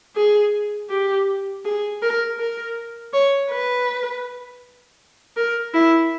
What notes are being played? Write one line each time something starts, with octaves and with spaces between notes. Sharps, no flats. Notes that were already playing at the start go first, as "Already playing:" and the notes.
G#4
G4
G#4
A#4
A#4
C#5
B4
A#4
E4